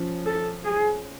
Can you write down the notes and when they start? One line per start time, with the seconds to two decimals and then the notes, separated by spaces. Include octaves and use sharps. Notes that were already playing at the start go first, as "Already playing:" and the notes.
Already playing: F3 C#4
0.26 A4
0.65 G#4